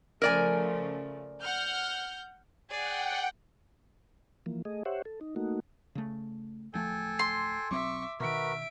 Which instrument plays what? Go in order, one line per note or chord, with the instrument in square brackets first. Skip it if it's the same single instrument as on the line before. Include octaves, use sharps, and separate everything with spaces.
[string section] C#3 F3 A3 [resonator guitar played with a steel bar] A#4 D5 G#5
[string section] F#5 F6 G6
[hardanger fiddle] G#4 D5 [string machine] F#5 G5
[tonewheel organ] E3 F3 A#3
A3 G#4 D#5
G4 C5 C#5 E5 F#5
A4
D#4
A3 A#3 D#4 F#4
[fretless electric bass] C#3 A3
[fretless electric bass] D1 F3 A3 [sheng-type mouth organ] A4 G5 G#5
[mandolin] C6
[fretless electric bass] B1 F#3 C4 [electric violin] E5 D6 [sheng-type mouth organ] C#6
[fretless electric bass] B2 D#3 [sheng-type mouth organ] F#4 A#4 B4 [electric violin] E5 D7